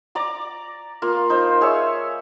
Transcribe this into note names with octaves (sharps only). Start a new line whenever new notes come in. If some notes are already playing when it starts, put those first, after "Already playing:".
D5 A#5 D6
A#3 F4
D#4 C5
G#4 C#5 E5 C#6